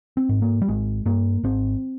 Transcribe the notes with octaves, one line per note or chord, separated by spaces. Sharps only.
C4
G#2
A#3
G3
G#1 G#3
G2 A#3
G#1 C4